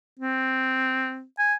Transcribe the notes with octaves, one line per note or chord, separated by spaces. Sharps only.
C4
G#5